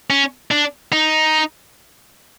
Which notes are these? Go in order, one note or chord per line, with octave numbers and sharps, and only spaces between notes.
C#4
D4
D#4